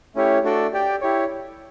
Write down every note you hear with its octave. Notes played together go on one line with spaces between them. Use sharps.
A3 C#4 E4 G4 C#5
A3 D4 F#4 A4 D5
G4 D5 G5
E4 G4 C#5